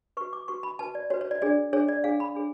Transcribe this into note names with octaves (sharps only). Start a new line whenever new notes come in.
F#4 B4 C#6
D6
F#4 B4 C#6
B5
F#4 B4 A5
D5
F#4 B4 C#5
C#5
D5
D4 G#4 C#5 D5
D4 G#4 C#5
D5
D4 G#4 C#5 F5
B5
D4 G#4 C#5